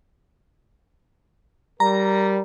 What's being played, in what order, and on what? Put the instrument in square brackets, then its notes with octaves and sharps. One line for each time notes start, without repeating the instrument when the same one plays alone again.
[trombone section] G3 A#4 [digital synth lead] A#5